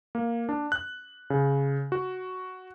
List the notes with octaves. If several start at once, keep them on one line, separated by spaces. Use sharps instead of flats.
A#3
D4
F#6
C#3
F#4